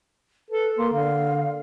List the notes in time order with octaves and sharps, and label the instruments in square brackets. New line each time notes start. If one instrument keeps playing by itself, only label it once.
[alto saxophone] A4 [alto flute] B4
[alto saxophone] A#3 [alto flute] C6
[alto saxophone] D3 [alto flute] F5